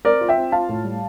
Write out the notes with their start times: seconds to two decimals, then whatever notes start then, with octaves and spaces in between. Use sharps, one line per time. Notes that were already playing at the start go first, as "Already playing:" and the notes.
0.05 C4 A#4 D5
0.21 F4
0.29 E5 G5
0.37 C4
0.52 F4 F5 A5
0.69 A2
0.84 G3